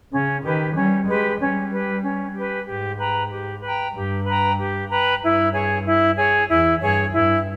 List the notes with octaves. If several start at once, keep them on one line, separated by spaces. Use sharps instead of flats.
C#3 C#4
D#3 G4 B4
G3 C#4
G#3 G4 B4
G3 C#4
G4 B4
C#4
G4 B4
G#2 G4
B4 G5 A#5
G4
B4 G5 A#5
G2 G4
B4 G5 A#5
G4
B4 G5 A#5
G2 E4
G#4 C#5
E4
G#4 C#5
E2 E4
G2 G#4 C#5
G2 E4